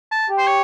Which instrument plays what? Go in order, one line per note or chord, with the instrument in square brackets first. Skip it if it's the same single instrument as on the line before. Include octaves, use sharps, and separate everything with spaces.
[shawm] A5
[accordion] G4
[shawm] C5
C#5